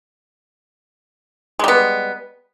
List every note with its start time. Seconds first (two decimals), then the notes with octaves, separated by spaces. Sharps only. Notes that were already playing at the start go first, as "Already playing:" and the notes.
1.59 G#3
1.64 G3
1.68 B3